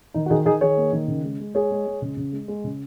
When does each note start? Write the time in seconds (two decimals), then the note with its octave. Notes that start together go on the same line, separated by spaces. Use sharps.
0.14 D#3 D#4
0.26 F#4
0.30 D#3 D#4 G#4
0.46 D#3 D#4 G#4
0.61 D#3 G#4 C#5
0.77 A#3
0.93 D#3
1.08 C#3
1.24 G#3
1.40 G#3
1.54 G#3 G#4 C#5
1.71 G#3
1.86 G#3
2.02 C#3
2.17 C#3
2.32 G#3
2.48 G#3
2.64 C#3